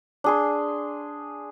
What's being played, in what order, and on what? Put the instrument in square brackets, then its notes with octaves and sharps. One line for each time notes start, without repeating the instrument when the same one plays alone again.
[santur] D4 G#4 C6